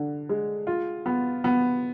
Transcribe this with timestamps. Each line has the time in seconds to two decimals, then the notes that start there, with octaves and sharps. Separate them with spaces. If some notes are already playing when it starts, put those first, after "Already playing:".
Already playing: D3
0.29 G#3
0.67 F4
1.06 B3
1.44 B3